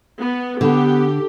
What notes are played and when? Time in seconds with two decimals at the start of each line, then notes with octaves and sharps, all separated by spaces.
0.20 B3
0.61 D3 B3 G4